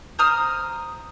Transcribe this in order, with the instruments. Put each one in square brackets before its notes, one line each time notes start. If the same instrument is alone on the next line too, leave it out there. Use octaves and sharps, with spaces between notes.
[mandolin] C5 A#5 D#6 F6